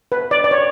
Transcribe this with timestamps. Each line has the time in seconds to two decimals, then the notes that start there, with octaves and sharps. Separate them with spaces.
0.12 B4
0.31 D5
0.44 D5
0.51 C#5